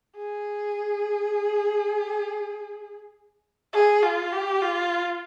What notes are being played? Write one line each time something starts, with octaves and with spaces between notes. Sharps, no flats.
G#4
G#4
F4
G4
F4